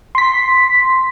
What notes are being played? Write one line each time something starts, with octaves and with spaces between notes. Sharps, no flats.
C6 B6